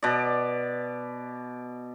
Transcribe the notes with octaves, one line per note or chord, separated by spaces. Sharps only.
B2 D5